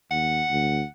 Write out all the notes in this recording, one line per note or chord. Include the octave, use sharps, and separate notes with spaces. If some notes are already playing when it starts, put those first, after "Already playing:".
D#2 F#5
D2